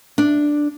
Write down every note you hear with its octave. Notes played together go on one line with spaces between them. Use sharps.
D4